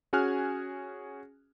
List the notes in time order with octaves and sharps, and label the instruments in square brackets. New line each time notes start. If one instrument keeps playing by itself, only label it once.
[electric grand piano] C#4 F#4 G#4 G#5 F6 F#6